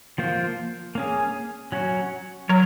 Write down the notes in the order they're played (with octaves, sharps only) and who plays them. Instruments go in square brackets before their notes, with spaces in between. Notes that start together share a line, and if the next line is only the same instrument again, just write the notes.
[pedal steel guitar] F3 A#3 F4 C5
A#3 C#4 G#4
F#3 C#4 F#4
[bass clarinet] F#3 [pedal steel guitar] A#4 C#5